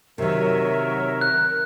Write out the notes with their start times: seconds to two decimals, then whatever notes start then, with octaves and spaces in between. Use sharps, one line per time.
0.18 C3 D#3 F#3 A#4 C#5 E5
1.21 F#6